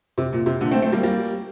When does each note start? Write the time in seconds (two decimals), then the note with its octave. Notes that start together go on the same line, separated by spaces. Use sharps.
0.18 C3
0.33 A#2
0.46 C3
0.60 A#2 D3
0.71 A3 C4
0.82 A3 C4
0.92 G3 A#3
1.03 G3 A#3